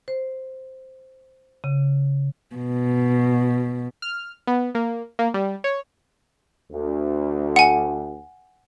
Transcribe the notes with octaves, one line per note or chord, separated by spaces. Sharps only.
C5
C#3
B2
F6
B3
A#3
A#3
G3
C#5
D2
F#5 G#5